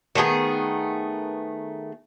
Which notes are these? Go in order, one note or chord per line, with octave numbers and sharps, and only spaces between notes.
D#3 A3 B3 G#4